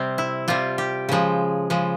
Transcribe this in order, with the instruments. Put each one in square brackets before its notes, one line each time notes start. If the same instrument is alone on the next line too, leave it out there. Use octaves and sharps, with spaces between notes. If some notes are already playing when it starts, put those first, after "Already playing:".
Already playing: [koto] C3 G3 C4
E4
C3 G3 F4
G4
C#3 F3 G#3
C#3 F3 G#3